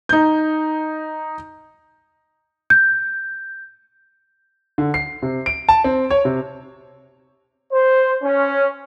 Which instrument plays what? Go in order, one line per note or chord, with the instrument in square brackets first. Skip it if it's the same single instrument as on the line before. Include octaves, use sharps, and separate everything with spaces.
[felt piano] D#4 G6
[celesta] G6
[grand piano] D3
C7
C3
D7
A5
C4
C#5
C3
[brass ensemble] C5
C#4